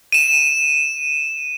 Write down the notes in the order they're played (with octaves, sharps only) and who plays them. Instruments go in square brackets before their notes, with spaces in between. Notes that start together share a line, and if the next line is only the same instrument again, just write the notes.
[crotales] D#7 E7